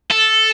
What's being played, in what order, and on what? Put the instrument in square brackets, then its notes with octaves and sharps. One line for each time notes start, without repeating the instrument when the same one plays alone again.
[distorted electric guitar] A4